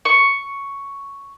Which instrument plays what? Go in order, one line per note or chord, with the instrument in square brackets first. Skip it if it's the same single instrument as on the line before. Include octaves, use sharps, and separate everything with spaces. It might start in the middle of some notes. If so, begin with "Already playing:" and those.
[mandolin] C#6